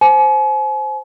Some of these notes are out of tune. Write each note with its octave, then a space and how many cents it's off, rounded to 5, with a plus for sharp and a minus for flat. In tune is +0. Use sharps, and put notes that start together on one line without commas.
C5 +0 G#5 +40